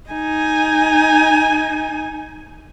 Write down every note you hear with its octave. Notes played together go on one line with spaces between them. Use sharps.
D#4 G#5